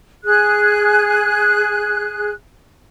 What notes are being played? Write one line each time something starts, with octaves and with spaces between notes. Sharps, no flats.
G#4 F#6